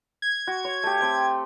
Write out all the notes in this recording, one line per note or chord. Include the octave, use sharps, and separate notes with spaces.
G#6
F#4
C#5
A3 G4
A3 C4 G5